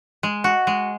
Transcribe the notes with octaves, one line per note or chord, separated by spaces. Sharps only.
G#3
F#4
G#3